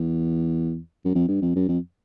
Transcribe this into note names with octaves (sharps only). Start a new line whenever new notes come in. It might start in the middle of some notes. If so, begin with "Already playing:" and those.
Already playing: E2
F#2
F2
G2
F2
F#2
F2